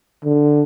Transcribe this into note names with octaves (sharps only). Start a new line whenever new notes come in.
D3